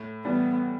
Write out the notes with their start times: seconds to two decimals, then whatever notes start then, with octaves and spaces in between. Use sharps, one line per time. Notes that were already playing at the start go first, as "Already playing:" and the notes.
Already playing: A2
0.25 E3 G3 B3